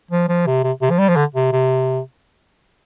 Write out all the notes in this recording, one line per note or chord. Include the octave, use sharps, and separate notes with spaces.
F3
F3
C3
C3
C3
F3
G3
F3
D3
C3
C3